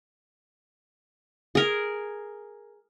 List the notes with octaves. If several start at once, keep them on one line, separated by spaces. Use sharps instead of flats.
G#4 A#4